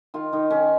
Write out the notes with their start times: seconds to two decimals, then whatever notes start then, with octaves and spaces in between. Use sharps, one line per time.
0.14 D#3 F4
0.33 D#3 D#4
0.50 D#3 C#4